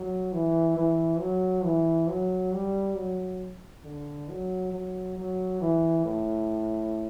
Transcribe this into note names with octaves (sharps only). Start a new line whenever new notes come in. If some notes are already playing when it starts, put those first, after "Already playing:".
Already playing: F#3
E3
E3
F#3
E3
F#3
G3
F#3
D3
F#3
F#3
F#3
E3
A2